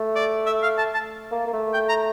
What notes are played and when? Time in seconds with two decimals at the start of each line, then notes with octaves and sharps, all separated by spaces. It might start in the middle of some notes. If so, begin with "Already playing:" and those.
Already playing: A3
0.16 D5
0.46 E5
0.63 F5
0.78 A5
0.94 A5
1.31 A#3
1.47 A#3
1.53 A3
1.74 G5
1.89 A#5